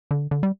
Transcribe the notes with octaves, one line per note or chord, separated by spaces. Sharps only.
D3
D3
G3